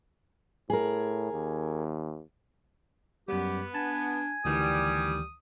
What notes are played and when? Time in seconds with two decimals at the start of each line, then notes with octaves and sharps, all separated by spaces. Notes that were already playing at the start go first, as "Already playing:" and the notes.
0.70 A2 G#4 A#4
1.32 D#2
3.28 F#2 G3 B3 G4
3.75 D4 G#5 A5
4.45 D2 D#3 E3 G3 D#6